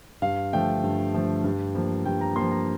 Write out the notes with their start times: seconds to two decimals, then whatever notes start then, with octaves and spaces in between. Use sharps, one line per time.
0.22 G2 F5
0.53 D3 F3 A3 G5
0.83 G2
1.13 D3 F3 A3
1.44 G2
1.75 F3 A#3
2.05 G2 G5
2.21 A#5
2.36 F3 A#3 C6
2.51 A#5